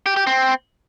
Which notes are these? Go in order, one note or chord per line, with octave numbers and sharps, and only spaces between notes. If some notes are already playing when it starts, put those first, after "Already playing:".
G4
G4
C4